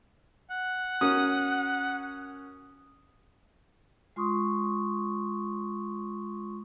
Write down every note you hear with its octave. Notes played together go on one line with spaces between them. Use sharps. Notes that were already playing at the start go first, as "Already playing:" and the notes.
F#5
C#4 F#4 A#4 D#6
G#3 F4 C6 C#6 D#6